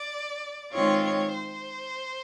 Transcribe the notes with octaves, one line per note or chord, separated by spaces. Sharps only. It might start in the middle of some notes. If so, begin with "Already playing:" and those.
Already playing: D5
D#3 G#3 C4 F4 C#5
C#5
C5